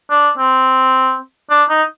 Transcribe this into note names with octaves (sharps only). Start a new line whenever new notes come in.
D4
C4
D4
D#4